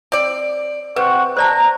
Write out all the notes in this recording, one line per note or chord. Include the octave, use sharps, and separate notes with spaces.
C4 D5
C3 C4 B4 F#5 C#6
C5 D5 A5 A#5